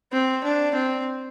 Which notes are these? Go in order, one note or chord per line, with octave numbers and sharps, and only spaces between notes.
C4
D4
C4